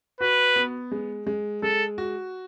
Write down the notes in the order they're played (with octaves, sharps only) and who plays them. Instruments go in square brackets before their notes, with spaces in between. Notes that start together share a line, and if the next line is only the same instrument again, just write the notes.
[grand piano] F#4 [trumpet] B4
[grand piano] B3
G#3
G#3
[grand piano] G#3 [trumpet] A4
[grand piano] F#4